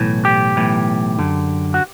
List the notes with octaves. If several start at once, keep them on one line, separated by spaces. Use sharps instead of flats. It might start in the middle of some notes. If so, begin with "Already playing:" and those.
Already playing: B1 A2 E3
G4
B1 A2 E3
F#2 D3
F#4